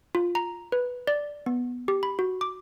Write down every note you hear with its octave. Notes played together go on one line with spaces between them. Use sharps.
F4
A#5
B4
D5
B3
G4
B5
F#4
D6